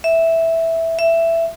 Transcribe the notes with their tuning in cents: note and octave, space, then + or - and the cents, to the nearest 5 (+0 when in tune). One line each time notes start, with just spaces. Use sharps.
E5 -5
E5 +10